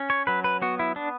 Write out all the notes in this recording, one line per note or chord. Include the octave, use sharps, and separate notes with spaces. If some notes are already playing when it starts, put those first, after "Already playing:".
Already playing: C#4
C#5
F#3 B4
B4
B3 F#4
E4
B3 D4